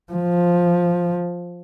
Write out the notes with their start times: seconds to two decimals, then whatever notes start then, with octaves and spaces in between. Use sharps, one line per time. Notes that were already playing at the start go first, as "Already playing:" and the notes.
0.13 F3